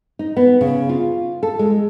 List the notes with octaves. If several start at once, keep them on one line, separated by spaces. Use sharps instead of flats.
D#4
B3
C#3
F4
A4
G#3